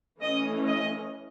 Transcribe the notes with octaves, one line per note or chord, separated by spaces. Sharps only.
E3 A3 C#4 D#5
D#5